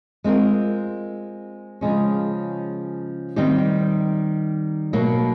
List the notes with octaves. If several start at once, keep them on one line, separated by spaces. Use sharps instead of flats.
G#3 C4 F4 A#4
C#3 F3 G#3 C#4
D#3 G3 C4 D#4 G4
B2 F#3 A#3